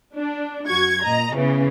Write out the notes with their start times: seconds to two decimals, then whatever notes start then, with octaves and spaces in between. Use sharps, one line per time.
0.15 D4
0.67 F#2 F#4 C#6 G#6
1.03 A#2 D#5 A#5
1.34 C#3 E3 B3